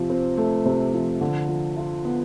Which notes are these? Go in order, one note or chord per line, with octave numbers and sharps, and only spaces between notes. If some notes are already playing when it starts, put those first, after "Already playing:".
Already playing: C3 F3
C4
A3
C3
F3
D3
F3
F4
B3